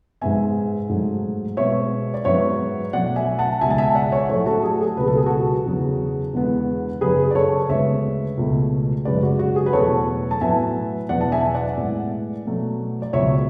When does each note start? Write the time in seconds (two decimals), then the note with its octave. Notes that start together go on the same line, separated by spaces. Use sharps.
0.21 G#2 G#3 B3 E5 G#5
0.89 G#2 F#3 A3
1.57 B2 G#3 B3 C#5 E5
2.14 D5
2.25 G#2 F#3 B3 C#5 E5
2.93 B2 F#3 A3 D5 F#5
3.16 E5 G#5
3.39 F#5 A5
3.61 C#2 B2 G#3 E5 G#5
3.70 A5
3.78 E5 G#5
3.95 D5 F#5
4.12 C#5 E5
4.29 A2 F#3 A3 A4 C#5
4.46 F#4 A4
4.63 G#4
4.75 A4
4.81 G#4
4.97 C#2 B2 F#3 B3 B4
5.07 A4
5.17 G#4
5.26 F#4 A4
5.65 E2 C#3 F#3
6.33 E2 D3 G#3 B3
7.01 F#2 C#3 F#3 G#4 B4
7.31 D5
7.35 A4 C#5
7.69 D2 C#3 G#3 B3 C#5 E5
8.37 C#2 B2 A3
9.05 F#2 C#3 G#3 B4 D5
9.23 F#4
9.39 F#4
9.56 G#4
9.66 B4
9.73 E2 B2 F#3 A3 A4 C#5
10.31 A5
10.41 A2 F#3 B3 E5 G#5
11.09 E2 B2 F#3 B3 D5 F#5
11.21 A5
11.32 E5 G#5
11.44 G#5
11.55 D5 F#5
11.77 A2 G#3 B3
12.45 B2 F#3 A3
13.02 D5
13.13 C#2 B2 F#3 C#5 E5